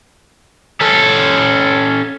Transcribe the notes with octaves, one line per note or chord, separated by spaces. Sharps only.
C#4 A4